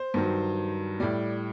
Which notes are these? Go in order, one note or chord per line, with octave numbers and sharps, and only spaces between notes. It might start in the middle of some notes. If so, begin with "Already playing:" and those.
Already playing: C5
G2 D#3 F#3
A2 G3 D5